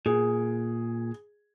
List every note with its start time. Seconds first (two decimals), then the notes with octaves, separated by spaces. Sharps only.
0.06 A#2 G#4